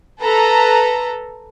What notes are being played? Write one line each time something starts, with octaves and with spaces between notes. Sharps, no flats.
A4 B4 A#5